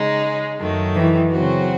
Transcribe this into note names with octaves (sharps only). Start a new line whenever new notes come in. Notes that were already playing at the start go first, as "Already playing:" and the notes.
Already playing: C#3 G#3 D#4
F#2 D#3 A3
E3
C#3 F#3 C4 F#4